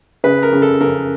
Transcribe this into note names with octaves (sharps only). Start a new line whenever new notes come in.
C#3 B4
A#4
C#3
A4
C#3 A#4